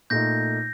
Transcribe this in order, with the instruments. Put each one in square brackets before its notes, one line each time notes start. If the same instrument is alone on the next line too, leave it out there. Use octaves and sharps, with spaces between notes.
[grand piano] A#2 A3 D#4 [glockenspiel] G6 A#6